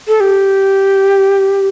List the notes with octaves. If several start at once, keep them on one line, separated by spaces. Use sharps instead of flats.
A4
G4